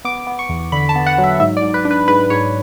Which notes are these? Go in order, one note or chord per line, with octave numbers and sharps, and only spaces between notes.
B3 D6
B3
C#6
E2
D3 B5
A5
B3
F#5
F#3
E5
G#2 E5
D5
G#2
B4
D4
B4
G#2 B4
G#2 C#5